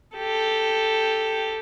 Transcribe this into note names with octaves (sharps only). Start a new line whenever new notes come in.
G4 A4